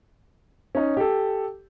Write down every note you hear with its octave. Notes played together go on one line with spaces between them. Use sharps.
C#4 D#4
G4 A4